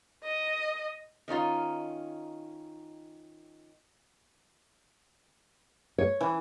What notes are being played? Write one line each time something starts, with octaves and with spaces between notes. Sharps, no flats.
D#5
D#3 C#4 D#4 F4
C#5
E3